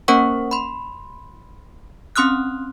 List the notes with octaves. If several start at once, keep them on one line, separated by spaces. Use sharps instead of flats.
A#3 C#4 A#4 C5 F#5 C#6
B5 C6
C4 C#4 C6 D#6 F6 F#6